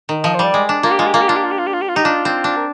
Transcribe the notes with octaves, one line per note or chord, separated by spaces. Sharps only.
D#3
F3 D#5
C5
G3 D5
G#3
D4
A#3 F4
G4
G#3 F4
G4
A#3 F4
G4
D4 F4
G4
F4
G4
F4
G4
F4
G4
F4
D#4 G4
D4 F4
C4
D4
A#4